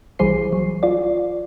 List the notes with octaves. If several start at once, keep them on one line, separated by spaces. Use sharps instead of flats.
B1 E3 G3 G#4 C5 C7
F#3
F4 D5